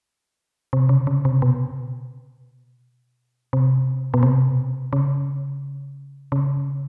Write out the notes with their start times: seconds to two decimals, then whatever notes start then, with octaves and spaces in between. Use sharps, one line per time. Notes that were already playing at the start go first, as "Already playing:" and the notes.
0.73 C3
0.89 C#3
1.07 C#3
1.25 C3
1.42 B2
3.53 C3
4.14 B2
4.23 C3
4.93 C#3
6.32 C#3